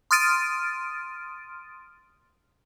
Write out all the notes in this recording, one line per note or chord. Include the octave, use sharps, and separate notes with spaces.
C6 D#6 F6 A6 D7 D#7